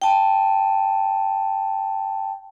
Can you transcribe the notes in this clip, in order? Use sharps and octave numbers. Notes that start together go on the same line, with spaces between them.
G5 A5